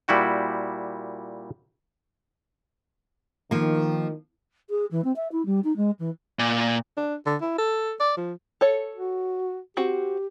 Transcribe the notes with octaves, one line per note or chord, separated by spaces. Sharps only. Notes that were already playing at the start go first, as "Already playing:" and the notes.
A#2 G3 E4 F#4 G5
D#3 F3 A#3
G#4
E3
C4
E5
E4
G3
D#4
G#3
E3
A#2
D4
D3
E4
A4
D5
F3
A4 C#5
F#4
C4 F#4 G4